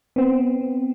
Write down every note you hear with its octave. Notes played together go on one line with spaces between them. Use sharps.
B3 C4